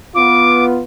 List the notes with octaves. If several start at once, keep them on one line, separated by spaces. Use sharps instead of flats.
B3 F4 D6